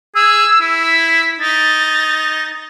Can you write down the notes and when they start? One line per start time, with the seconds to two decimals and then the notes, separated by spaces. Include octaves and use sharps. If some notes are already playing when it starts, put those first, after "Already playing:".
0.15 G#4 E6
0.61 E4
0.83 B6
1.40 D#4 A6